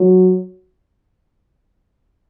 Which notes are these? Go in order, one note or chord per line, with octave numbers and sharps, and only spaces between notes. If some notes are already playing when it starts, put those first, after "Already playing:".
Already playing: F#3